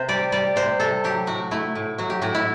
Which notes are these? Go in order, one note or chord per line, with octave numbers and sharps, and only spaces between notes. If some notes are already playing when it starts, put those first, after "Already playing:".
Already playing: C3 C5
G3 D5
G3 D5
C3 C5
C3 A4
F#3 G4
A2 F#4
A3 E4
A2
F#3 F#4
G4
A2 F#4
E4